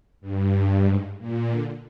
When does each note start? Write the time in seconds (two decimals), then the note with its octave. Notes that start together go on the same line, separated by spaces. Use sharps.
0.21 G2
0.86 G#2
1.19 A#2
1.50 D3